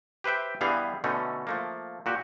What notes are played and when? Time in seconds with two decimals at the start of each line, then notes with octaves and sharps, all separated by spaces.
0.24 G4 B4 C5 E5 G5
0.61 G2 E3 G3 B3 G#4 F5
1.04 B2 D3 A3 C#4 D#4
1.47 F3 A3 A#3
2.06 A#2 F#4 G4